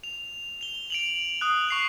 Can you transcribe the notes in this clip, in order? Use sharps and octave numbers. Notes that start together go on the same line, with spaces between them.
F7
F7 G7
D7 F7 F#7
D#6 F#6
C#6 C7 F7